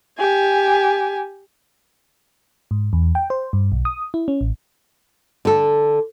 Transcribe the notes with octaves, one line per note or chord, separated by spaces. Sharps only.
G4 G#5
G#2
E2
G5
C5
G2
B1
D#6
E4
C#4
A1
D3 A4